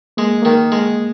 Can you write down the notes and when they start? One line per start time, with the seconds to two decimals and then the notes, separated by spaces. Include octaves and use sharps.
0.17 G#3 A#3
0.42 D#3 A#3
0.72 G#3